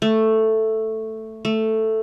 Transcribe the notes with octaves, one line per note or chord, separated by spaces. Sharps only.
A3
A3